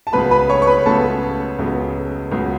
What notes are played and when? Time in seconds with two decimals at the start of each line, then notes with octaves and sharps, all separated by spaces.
0.07 A5
0.13 C#2 C#3 F#3 B3 B4 B5
0.31 B4 B5
0.49 C#5 C#6
0.62 C#6
0.67 B4 B5
0.86 C#2 C#3 F#3 B3 A4 A5
1.59 C#2 C#3 F#3 B3
2.32 C#2 C#3 F#3 B3